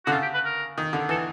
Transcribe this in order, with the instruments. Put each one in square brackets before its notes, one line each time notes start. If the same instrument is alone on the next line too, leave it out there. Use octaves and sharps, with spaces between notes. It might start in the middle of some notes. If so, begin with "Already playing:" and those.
[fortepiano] D3 [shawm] F#4
[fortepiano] C#3 [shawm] F4
[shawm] G4
B4
A#4
[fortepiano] D#3
D3
[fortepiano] E3 [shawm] A4